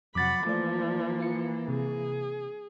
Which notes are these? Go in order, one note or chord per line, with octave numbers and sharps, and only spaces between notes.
F2 C3 F#3 F#5 B5 D6 A6
E3 F3 A3 A#3 D5
F4 C#7
C3 G#4